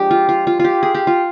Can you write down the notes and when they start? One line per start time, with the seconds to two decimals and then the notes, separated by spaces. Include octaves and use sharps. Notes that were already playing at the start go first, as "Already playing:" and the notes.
Already playing: F3 G#3 D4 G4
0.11 F4
0.29 F4
0.47 F4
0.60 F4 G4
0.83 G#4
0.95 G4
1.07 F4